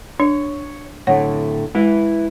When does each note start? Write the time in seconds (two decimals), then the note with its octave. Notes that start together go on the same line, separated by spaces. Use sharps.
0.20 D4 C#5
1.07 A2 D3 A3 C#5 F#5
1.75 G#3 E4 B4